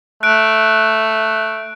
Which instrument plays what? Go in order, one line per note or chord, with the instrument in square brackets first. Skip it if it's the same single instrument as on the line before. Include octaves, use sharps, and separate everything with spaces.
[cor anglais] A3 [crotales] F#6 D7